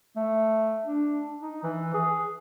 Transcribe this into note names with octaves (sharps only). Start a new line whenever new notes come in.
A3
D4
D#4
E3
G#4